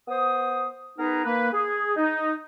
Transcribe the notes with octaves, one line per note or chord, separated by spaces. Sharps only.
B3 C5 D#6
B3 D#4 G#4 A#4 B4
A#3 B4
G#4
D#4